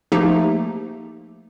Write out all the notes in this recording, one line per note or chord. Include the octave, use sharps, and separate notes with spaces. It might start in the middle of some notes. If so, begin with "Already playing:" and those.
F3 A3 A#3 D#4 G4